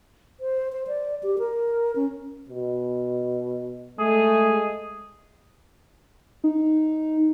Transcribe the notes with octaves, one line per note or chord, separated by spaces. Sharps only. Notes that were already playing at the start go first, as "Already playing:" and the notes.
C5
C5
D5
G4
A#4
C#4
B2
G#3 A3 G#4
D#4